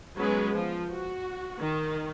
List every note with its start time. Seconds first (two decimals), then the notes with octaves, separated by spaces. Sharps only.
0.17 F#3 G#3 B3 C#4 G#4 B4
0.54 F3
0.90 F#4
1.59 D#3